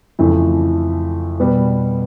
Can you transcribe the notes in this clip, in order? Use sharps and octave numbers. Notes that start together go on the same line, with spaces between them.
F2 C#3 E3 A3 E4
B2 G3 B3